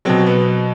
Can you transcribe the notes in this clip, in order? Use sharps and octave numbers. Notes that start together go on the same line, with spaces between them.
B2 F#3 C4
B3